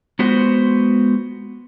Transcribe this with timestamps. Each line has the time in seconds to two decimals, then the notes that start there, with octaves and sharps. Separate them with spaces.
0.19 G#3 B3 F#4 C5